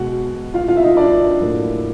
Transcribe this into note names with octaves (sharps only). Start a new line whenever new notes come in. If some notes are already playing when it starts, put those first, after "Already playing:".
Already playing: B2 G#3 F#4 F#5
F4 F5
F4 F5
E5
D#4 D#5
D4 D5
A2 F#3 A#3